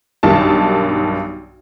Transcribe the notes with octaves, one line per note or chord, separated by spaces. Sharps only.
B1 G2 D#3 A5